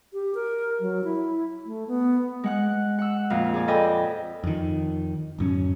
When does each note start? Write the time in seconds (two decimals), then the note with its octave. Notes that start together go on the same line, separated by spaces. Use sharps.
0.13 G4
0.35 A#4
0.80 F#3
1.04 E4
1.65 A3
1.88 B3
2.44 G#3 F#5 F#6
2.99 F#5 E6
3.30 F2 A#2 F5
3.54 G#4 D5
3.68 A4 B4 D5 D#5 G5 G#5
4.44 F2 D#3
5.39 D1 F#2 C#4